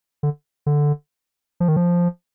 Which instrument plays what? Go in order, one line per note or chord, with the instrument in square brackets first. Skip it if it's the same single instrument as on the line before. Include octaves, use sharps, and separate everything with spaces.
[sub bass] D3
D3
F3
D#3
F3